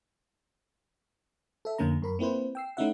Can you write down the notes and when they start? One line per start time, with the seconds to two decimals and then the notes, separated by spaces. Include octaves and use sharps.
1.65 A4 E5
1.78 F2 D3 A#3 C#4 A#5
2.02 F#2 A#4 B5
2.19 A#3 C4 E4 B4 C5
2.55 G5 E6 C7
2.77 A3 C#4 D#4 E4 E5 F#5